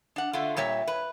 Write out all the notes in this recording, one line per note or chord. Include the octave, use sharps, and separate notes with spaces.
D4 F#5
D3 A3 F4
A#2 G3 C#5 E5
B4